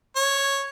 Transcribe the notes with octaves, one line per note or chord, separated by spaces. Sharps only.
C#5